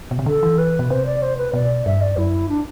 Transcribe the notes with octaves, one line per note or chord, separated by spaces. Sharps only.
B2
C3
D3 A4
E3
B4
B2
C3 C5
D5
C5
B4
B2 D5
G2 E5
D5
F#2 E4
D4